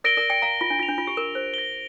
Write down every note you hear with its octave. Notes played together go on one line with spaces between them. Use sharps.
A#4 D5 A#6 D7 G7
A#4 D5
D5 G5
F5 A#5
F4
D4
F4 A#6 F7
D4
F4
G4
A#4
C5
A#6 G7